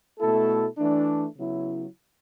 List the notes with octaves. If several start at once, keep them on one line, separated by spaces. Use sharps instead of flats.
B2 A3 E4 A4
E3 A3 D4
C#3 F#3 B3 E4